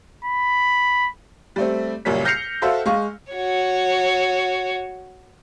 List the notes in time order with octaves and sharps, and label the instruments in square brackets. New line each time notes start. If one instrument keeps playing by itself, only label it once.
[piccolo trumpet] B5
[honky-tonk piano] G3 A3 C4
C#2 F#2 A#2 G3 C#5 B6
F6 G6 A#6 C7 C#7 F7
F#4 A4 C5 E5 F5
G#3 F5 C#6
[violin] F#4 C#5